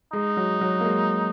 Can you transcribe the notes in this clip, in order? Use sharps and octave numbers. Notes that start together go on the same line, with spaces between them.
G#3 D#4
F#3
F#3
A#3
G#3